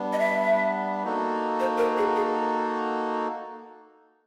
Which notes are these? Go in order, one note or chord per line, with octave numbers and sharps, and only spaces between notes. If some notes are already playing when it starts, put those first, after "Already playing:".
Already playing: G3 B3 D4
D#5
E5
A#3 D#4 F#4 A4
C5
A#4
G#4
G#4